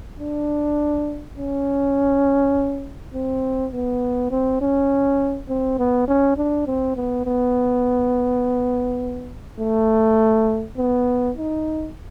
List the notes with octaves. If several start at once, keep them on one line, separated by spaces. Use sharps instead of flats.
D4
C#4
C4
B3
C4
C#4
C4
B3
C#4
D4
C4
B3
B3
A3
B3
D#4